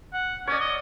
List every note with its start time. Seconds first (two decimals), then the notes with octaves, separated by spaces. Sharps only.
0.13 F#5
0.47 C#4 C#5 D5
0.60 D#5